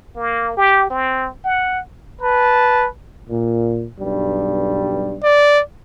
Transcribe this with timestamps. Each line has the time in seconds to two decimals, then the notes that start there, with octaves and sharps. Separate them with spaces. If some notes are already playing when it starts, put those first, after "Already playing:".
0.16 A#3
0.57 G4
0.90 C4
1.44 F#5
2.22 B4 A5
3.29 A#2
4.00 B1 G2 G3
5.24 D5